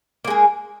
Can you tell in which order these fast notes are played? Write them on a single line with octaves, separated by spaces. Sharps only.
A#3 G#3 G#4